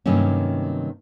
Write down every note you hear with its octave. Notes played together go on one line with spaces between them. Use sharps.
G2 C3 D#3 F#3 A#3 C#4